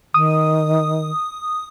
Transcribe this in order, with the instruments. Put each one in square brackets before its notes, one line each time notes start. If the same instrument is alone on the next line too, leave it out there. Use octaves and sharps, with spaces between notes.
[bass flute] D#3 [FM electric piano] D#6